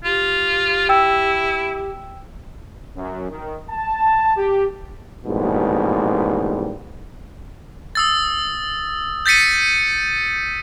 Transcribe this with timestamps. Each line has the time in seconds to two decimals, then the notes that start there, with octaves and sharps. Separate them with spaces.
0.04 F4 G4
0.89 E4 G5 E6
2.96 F#2
3.30 D#3
3.69 A5
4.37 G4
5.25 A1 F2 G#2 B2 G3 A#3
7.95 D#6 E6 A6
9.26 G6 A6 B6 C#7 D#7